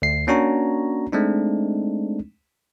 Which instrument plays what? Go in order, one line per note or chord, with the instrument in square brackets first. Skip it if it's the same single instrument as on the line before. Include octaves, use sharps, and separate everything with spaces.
[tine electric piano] D2 C7
A#3 C#4 D4 F#4 C#5 A#5
G#3 A3 C4 D4 D#4